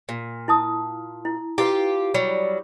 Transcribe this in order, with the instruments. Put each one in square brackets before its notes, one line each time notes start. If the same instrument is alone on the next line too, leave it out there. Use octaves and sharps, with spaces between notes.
[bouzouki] A#2
[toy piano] E4 A5 D#6
E4
[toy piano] E4 B4 [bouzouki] F4 G4
[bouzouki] F#3 G3 [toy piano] B5